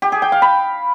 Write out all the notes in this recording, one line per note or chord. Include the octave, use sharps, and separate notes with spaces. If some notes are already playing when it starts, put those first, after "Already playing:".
G4
G#4
G5
F5
B5